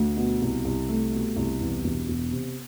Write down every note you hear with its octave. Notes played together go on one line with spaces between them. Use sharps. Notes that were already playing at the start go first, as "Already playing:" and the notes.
Already playing: D2
B2
C2
C2
A3
B2
C2
E2
E1
E1
C3